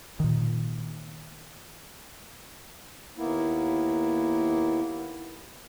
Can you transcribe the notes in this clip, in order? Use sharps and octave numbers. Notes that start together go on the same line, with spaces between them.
A#2 D#3
D#2 A#3 B3 E4